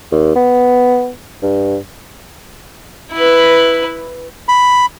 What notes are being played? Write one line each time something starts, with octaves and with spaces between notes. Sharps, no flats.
D#2
B3
G2
E4 B4
B5